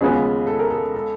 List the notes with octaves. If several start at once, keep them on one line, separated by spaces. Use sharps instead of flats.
D#2 C#3 F3 G#3 B3 G#4
A4
A#4
A4
A4